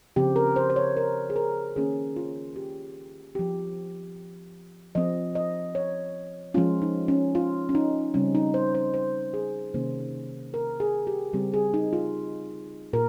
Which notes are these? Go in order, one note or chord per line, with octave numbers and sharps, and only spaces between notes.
C#3 F3 C4 G4
A#4
C5
C5
C#5
A#4
G#4
A#4
D#3 A#3 C#4 G#4
F4
G4
F3 C4 G4
F3 C4 D#5
D#5
C#5
F3 G#3 C#4 F4
D#4
C#4
F4
C#4
D#4
C#3 G3 C4 C#4
D#4
C5
C5
C5
G#4
C3 D#3 A#3 C#4 C5
A#4
G#4
G4
C#3 G3 C4 G4
G#4
D#4
F4
A#2 A#4